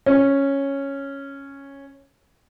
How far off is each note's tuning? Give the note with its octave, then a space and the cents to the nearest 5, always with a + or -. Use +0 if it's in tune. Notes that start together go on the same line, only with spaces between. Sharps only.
C#4 -5